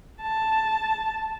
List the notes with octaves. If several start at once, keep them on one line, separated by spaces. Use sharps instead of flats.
A5